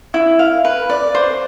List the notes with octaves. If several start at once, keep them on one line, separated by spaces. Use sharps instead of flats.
E4
F5
B4
D5
C5